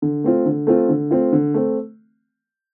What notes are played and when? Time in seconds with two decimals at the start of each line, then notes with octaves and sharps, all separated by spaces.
0.02 D3
0.24 A3 C4 F4
0.46 D3
0.67 A3 C4 F4
0.89 D3
1.11 A3 C4 F4
1.33 D3
1.54 A3 C4